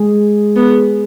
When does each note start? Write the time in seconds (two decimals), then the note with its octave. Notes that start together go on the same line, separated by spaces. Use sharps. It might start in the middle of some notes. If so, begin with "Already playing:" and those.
Already playing: G#3 G#4
0.56 B3